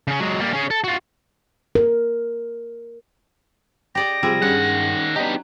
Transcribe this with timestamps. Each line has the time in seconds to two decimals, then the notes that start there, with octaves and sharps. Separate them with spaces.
0.07 C#3 C#4
0.20 F#3 G#3
0.40 G3 A#3
0.53 C#4 G#4
0.70 A4
0.84 F4 F#4
1.75 A#4
3.95 G4 D5 D#5 A#6
4.23 C3 F3 G3 G#3 G#4 E6
4.42 G2 D#3 C#4 F#5
5.16 F#3 B3 D4 D#4 G4